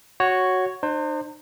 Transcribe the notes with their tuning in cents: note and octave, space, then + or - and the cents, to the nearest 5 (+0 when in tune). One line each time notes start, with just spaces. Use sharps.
F#4 +0 C#5 +0
D#4 -45 C5 +20